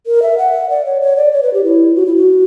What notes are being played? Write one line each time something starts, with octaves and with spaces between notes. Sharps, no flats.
A#4
E5
F#5
D5
C#5
C#5
D5
C#5
B4
G4
E4
F#4
E4
F#4